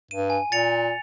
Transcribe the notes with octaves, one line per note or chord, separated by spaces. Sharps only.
G2 D#7
G#5
A#2 A6 C#7 F7